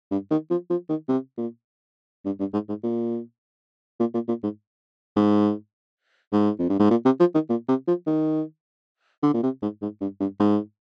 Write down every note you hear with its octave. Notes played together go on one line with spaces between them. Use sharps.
G2
D#3
F3
F3
D#3
C3
A#2
G2
G2
G#2
G#2
A#2
A#2
A#2
A#2
G#2
G#2
G#2
F2
G2
G#2
A#2
C3
F3
D#3
A#2
C3
F3
D#3
D3
A#2
C3
G#2
G#2
G2
G2
G#2